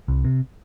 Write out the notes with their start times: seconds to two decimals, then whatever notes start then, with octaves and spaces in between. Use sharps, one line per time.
0.08 C2
0.25 C3